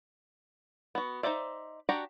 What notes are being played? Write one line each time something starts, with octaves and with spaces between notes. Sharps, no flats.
B3 F#4
D#4 A#4 C5 D5 E5
D4 F#4 G4 F#5 A#5